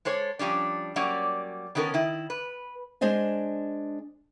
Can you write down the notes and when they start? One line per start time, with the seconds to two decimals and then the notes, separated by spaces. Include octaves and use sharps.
0.05 G#3 A4 C5 C#5
0.39 F3 G3 C#4 D4
0.96 F#3 G3 A#3 C#4 D5
1.75 D#3 B3 C#4 A4 A#4
1.94 D#3 E4
2.30 B4
3.01 G#3 D4 C5 D#5 G#5